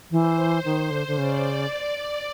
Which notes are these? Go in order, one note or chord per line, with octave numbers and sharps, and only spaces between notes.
E3 C5
D#3
D3
D3
C#3 D5